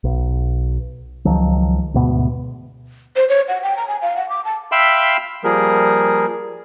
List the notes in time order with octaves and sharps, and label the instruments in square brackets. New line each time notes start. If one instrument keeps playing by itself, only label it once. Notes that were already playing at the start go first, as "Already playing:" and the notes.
[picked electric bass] B1
C#2 D#3 F3 F#3
D2 G#2 B2 B3
[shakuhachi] C5
C#5
F#5
G5
A#5
G#5
F5
F#5
D6
A5
[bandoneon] E5 F5 G5 B5 C6 E6
F3 G3 A#3 G#4 A#4